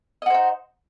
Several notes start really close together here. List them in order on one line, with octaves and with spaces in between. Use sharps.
D#5 F#4 C5 D#4